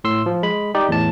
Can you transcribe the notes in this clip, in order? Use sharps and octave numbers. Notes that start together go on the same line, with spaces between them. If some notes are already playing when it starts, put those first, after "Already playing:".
A2 C6 E6 C7
F3
G#3 B5
D#4 G4 D5
E2 A2 A5